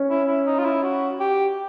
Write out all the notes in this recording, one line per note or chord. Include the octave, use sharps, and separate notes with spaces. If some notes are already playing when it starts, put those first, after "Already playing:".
Already playing: C#4
E4
E4
D#4
F4
E4
F#4
G4